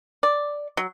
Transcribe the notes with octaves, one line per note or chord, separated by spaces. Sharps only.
D5
F#3